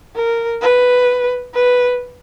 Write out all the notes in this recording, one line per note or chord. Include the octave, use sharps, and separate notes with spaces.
A#4
B4
B4